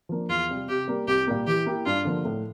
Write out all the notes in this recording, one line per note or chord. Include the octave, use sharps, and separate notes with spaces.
F3 A#3 D4
E2 F4
C3 G3
C3 G4
G3 A#3
C2 G4
A#2 G3 A#3
E3 G4
A#3 E4 G4
G2 F4
D3 F3 A#3
A2